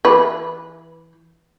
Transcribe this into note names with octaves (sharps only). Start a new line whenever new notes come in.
E3 B4